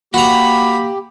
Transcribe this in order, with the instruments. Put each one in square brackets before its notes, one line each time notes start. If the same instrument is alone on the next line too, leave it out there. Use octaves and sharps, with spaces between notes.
[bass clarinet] A#3 [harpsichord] F#4 A#5 [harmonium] G4 [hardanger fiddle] B5